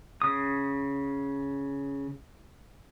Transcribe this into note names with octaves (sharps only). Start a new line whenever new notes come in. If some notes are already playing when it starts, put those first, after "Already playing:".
C#3 D#6